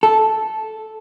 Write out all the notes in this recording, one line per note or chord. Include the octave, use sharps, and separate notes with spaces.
A4